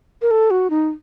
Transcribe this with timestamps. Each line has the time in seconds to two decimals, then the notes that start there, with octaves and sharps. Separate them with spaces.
0.22 A#4
0.31 A4
0.50 F#4
0.70 D#4